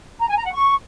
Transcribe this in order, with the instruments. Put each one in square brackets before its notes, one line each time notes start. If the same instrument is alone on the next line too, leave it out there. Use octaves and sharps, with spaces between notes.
[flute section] A#5
G#5
A#5
F#5
C#6